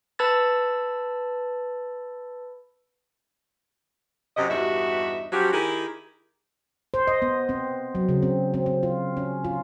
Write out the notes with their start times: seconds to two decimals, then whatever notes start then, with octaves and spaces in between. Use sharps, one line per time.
0.19 B4 A5 B5 E6 G#6 A6
4.37 F#2 C3 D#5
4.49 E2 G2 D#4 F#4 G4 E5
5.32 F3 F#3 C#4 F#4 G4
5.52 D#3 E4 G4 G#4
6.94 C5
7.07 D#5
7.22 B3
7.49 C4
7.95 F#3
8.09 C#3
8.22 C4
8.54 C4
8.66 C4
8.83 F4
9.17 C#4
9.44 F4